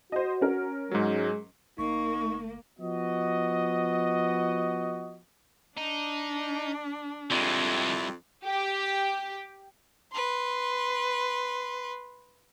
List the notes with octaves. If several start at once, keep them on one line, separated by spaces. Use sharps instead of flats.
F#4 C5 D#5
C#4 A#4
G#2 F#3 G#3
G1 A#3 D#4 C#6
F3 B3 F#4 D#5
D4 D#4
F2 D3 G3 G#3 E4
G4
B4 C6